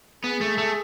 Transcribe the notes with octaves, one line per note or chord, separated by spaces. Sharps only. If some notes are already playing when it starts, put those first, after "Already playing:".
B3 G#4
A3
A3